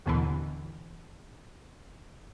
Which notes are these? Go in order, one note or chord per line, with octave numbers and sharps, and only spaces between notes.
A1 D#2 B2 D3 E3